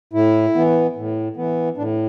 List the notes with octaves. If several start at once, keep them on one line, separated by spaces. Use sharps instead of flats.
A2 E4
E3 B3
A2
E3 B3
A2 D4